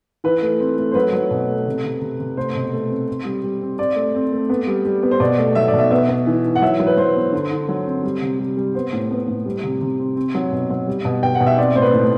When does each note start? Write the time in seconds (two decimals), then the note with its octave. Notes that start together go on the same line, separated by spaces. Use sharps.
0.24 E3 B4
0.42 A3
0.60 C4
0.78 A3
0.92 C5
0.95 F#3 B4
1.13 F#3
1.31 B2
1.49 A3
1.67 C3
1.84 C3
2.02 C3
2.20 C3
2.37 A3 C5
2.55 B2
2.73 A3
2.90 C4
3.08 C4
3.25 G3
3.44 G3
3.62 C4
3.79 C4 D5
3.96 A3
4.15 C4
4.33 A3
4.49 B3
4.67 G3
4.85 G3
5.03 B3
5.11 C5
5.20 B2 D5
5.38 A3
5.55 F#3 E5
5.68 D5
5.74 B2
5.79 E5
5.91 B3 E5
6.09 B3
6.27 E3
6.45 E3
6.56 F#5
6.62 F#3 E5
6.80 F#3
6.87 B4
6.98 F#3 C5
7.15 B3
7.33 D3
7.51 D3
7.69 F#3
7.86 C4
8.03 G3
8.22 C3
8.39 G3
8.57 G3
8.75 B3 C5
8.93 A2
9.11 B3
9.28 A2
9.46 G3
9.64 C3
9.81 C3
9.99 C4
10.16 C4
10.35 F#3
10.52 B2
10.70 F#3
10.87 G3
11.05 B2
11.23 B2 G5
11.35 F#5
11.40 B2
11.47 E5
11.58 C4 D5
11.76 A2 C5
11.82 B4
11.94 A2